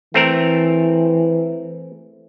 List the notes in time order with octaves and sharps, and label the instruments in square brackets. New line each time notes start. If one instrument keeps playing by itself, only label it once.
[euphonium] E3 [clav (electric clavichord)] A3 C4 A#4